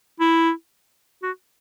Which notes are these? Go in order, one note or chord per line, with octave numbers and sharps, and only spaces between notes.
E4
F#4